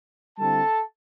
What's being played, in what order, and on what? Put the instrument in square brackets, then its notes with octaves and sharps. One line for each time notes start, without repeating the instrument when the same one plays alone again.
[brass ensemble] D3 G3 C4 E4 A4 A5